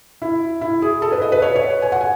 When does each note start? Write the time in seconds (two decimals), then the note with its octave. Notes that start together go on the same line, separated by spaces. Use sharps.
0.22 E4
0.61 E4
0.82 G#4
1.02 A4
1.12 B4
1.22 D#5
1.32 B4
1.42 C#5
1.56 C#5
1.82 G#5
1.92 F#5
2.01 G#5